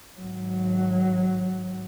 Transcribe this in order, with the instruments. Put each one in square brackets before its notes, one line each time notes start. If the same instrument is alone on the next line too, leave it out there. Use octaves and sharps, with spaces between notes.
[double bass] G#1 F#3